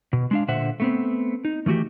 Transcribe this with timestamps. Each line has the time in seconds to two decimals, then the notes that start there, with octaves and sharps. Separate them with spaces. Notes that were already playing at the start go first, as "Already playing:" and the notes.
0.13 B2
0.31 G#3 D4 F5
0.48 A#2 D3 C5 E5 F#5
0.80 A3 B3 C4
1.45 D#4
1.66 D#3 E3 A3 F#4 G4